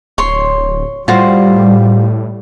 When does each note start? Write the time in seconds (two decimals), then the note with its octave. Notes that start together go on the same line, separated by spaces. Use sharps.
0.18 D1 C#5 C6
1.08 A2 G3 F4 F#4 C5